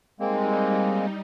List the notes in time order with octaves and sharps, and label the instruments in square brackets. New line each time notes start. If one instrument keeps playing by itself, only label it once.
[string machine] G3 D#4 [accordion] G#3 A#3 C4